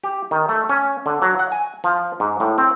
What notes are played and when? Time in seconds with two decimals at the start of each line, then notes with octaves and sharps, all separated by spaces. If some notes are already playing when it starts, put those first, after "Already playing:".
0.04 G4
0.31 D#3
0.49 A3
0.70 C#4
1.06 D3
1.22 F#3
1.39 F#5
1.52 G#5
1.84 F3
2.20 G#2
2.40 A2
2.58 C4